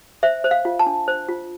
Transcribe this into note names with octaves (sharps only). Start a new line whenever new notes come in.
C5 E5
C5
F5
F4
A5
D4
C5
F4